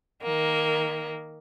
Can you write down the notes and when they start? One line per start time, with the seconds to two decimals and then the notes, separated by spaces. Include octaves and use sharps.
0.22 D#3 A#3